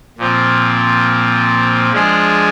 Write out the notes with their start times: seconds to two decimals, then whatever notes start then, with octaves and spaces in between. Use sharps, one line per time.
0.18 A#2 F3 C4
1.92 F3 G#3 D4 G#4